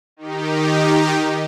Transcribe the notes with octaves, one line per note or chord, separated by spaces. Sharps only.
D#3 D#4 G4